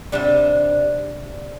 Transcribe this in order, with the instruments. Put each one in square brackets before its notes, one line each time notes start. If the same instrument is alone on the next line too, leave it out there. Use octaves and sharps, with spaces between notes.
[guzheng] C3 G3 D4